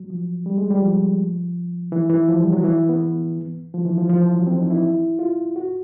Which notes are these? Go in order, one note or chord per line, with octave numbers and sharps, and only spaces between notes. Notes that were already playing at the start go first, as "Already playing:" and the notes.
Already playing: F#3
F3
G3
G#3
G3
F3
E3
E3
F3
G3
F#3
E3
B3
F3
E3
F3
F3
E3
F#3
C4
D#4
E4
F4
F#4